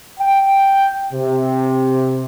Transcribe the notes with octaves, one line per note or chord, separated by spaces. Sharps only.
G5
C3